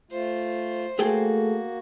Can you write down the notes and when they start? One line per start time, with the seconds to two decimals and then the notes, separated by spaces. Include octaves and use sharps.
0.11 A3 F4 C5
0.99 A3 A#3 F#4 G#4 A4 G5